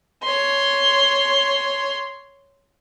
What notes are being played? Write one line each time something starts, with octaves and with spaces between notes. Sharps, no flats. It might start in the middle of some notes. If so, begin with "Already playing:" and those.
C#5 C6